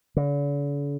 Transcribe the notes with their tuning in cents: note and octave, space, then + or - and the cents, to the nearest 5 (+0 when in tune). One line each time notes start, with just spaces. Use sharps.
D3 -45